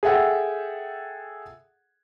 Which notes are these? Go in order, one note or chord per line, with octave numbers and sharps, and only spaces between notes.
G#4 A4 E5 F#5 G5